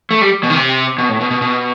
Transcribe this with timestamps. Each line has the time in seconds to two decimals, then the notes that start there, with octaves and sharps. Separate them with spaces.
0.11 A3
0.21 G3
0.43 B2
0.50 D#3
0.55 C3
0.98 B2
1.09 A2
1.21 B2
1.31 B2
1.42 B2